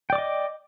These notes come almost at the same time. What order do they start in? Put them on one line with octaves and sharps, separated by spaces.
G5 D5 D6 D#5